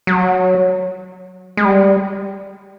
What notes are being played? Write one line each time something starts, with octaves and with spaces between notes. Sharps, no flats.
F#3
G#3
G3